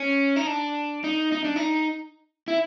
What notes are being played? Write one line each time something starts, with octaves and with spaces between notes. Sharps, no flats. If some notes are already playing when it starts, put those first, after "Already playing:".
Already playing: C#4
D#4
D4
D#4
D#4
D4
D#4
E4